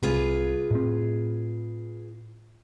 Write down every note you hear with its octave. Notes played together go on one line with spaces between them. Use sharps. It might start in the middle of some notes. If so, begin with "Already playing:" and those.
C2 C3 F4 G#4 B4
A2 C4